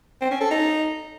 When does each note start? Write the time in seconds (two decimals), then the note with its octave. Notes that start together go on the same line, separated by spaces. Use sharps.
0.21 C4
0.31 C#4
0.41 A4
0.51 D#4